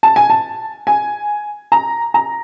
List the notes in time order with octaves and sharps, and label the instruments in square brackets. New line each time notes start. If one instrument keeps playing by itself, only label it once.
[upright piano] A5
G#5
A5
G#5
A#5
A#5